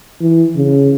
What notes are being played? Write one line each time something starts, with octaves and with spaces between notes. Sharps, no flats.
E3
C#3